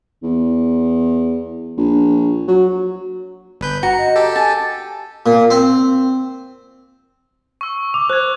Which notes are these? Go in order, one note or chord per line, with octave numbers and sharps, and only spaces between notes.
E2
A#1
F#3
G1 B4 G6
F#4 A#5 C#7
D#5
G4 A4
G#5 A5
A#2
C4
C#6 E6
D6 F7
C5 F#6 G#6